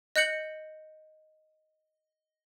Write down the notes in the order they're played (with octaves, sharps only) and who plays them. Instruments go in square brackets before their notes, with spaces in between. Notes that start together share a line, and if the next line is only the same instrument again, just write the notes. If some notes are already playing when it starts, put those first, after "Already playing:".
[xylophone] D#5 F#6 G6 C#7 F#7